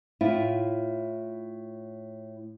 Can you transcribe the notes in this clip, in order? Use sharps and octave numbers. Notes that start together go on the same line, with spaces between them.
A2 E4 F4